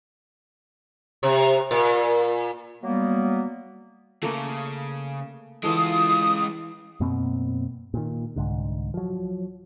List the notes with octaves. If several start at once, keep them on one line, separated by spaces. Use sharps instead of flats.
C3
A#2
F#3 G3 A#3 B3
C#3 A3 A#3
E3 G#3 F4 A4 D#6
F#2 B2 A#3 C4
A#2 D#3
C2 G#2 D3
F3 F#3